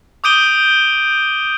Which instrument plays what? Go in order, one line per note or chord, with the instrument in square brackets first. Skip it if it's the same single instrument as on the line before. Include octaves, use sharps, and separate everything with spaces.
[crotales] D6 D#6 G6 D7 D#7 G7